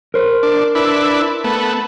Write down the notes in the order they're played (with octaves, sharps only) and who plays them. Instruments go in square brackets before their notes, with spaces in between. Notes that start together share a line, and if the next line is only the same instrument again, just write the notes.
[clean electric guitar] A#4 C5
[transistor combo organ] D4
D4 E4 B4
A3 B3